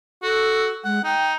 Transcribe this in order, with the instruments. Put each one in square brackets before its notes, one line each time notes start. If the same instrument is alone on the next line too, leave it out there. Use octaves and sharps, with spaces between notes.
[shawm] F#4 [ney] A4
[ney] G#3 [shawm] F#5
[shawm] D#4 [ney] G5